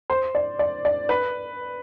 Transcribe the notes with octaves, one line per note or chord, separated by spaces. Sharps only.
C5
D5
D5
D5
B4